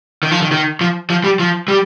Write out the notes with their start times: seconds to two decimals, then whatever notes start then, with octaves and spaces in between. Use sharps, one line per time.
0.23 D#3
0.31 F3
0.42 D#3
0.52 D#3
0.81 F3
1.10 F3
1.24 G3
1.40 F3
1.68 G3